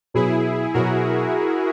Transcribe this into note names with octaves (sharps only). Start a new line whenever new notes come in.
B2 F#3 B3 E4 G#4
B2 F#3 B3 F#4 A#4